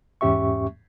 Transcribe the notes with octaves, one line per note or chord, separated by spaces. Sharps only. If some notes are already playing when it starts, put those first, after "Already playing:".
E2 G#2 C#4 G4 E5 C#6